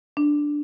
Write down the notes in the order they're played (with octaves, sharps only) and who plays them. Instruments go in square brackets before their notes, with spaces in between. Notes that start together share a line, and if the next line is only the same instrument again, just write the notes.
[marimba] D4